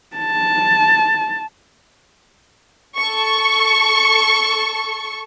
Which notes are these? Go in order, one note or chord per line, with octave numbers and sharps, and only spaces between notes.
A5
A4 C#6